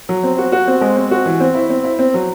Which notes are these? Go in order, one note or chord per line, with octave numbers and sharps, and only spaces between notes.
F#3
C4
F#4
F#4
C4
G#3
C4
F#4
E3
C4
E4
C4
E4
C4
F#3